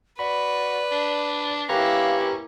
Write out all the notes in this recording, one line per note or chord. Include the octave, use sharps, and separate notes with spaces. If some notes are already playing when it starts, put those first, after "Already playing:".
F#4 B4 D5 B5
D4
A#3 C#4 E4 G4 B4 F5 A#5